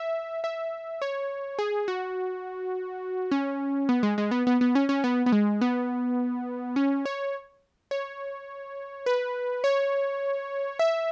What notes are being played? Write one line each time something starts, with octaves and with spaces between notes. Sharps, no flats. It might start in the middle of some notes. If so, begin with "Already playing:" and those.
Already playing: E5
E5
C#5
G#4
F#4
C#4
B3
G#3
G#3
B3
B3
B3
C#4
C#4
B3
B3
G#3
B3
C#4
C#5
C#5
B4
C#5
E5